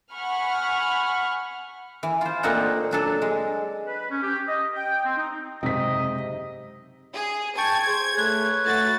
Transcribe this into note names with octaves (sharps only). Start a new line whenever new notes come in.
F#5 G#5 B5 C#6 F6
E3
F4 C5
A#2 A3 C4 D4 D#4 F#5
F#3 D4 A4
G#3
B4
C#4
G4
D#5
G5
C4
D#4
F#1 G#2 C3 C4 D#4 G4 D#5 B6
G#4
G5 A5 C#6 G#6
G#4 C5
A3 B4 C#5
A3 F#4 A6